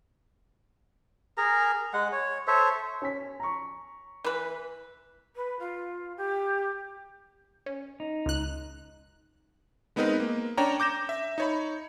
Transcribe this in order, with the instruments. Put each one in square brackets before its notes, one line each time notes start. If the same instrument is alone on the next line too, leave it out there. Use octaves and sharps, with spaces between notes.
[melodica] G#4 A#4 A#5
G#3 F#5
C#5
A4 C5 C#5 E5
[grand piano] C#4 G#5 B6
A#5 C#6
[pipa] E3 B4
[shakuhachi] B4
F4
G4
[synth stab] C#4
[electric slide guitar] D#4
[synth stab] C#2 F#6
[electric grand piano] G#3 B3 C4 D#4 A#4 B4
A#3
C#4 D4 C#5 G5 A#5
D6 G6 A#6 E7
E5
D#4 C#5 B5